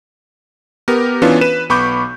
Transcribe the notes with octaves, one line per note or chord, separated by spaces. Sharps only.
B3 G4 A#4
E3 B3 C#4 D4 F4
B4 D#7 E7
B1 B3 B5 C#6 D6 G6